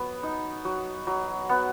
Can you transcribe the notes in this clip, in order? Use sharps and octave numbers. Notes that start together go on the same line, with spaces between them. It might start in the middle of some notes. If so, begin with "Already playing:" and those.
Already playing: F#3 B3
D#4
F#3
F#3
B3 F#5